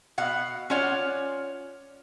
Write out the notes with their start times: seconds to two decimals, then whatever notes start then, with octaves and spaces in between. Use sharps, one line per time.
0.18 B2 F5 F#5
0.70 C#4 F4 C#5 D5 F#5